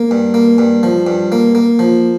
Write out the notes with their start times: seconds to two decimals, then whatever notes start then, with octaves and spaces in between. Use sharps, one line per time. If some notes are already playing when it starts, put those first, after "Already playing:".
Already playing: A#3
0.11 G2
0.34 A#3
0.58 G2
0.83 F3
1.07 G2
1.32 A#3
1.55 A#3
1.79 F3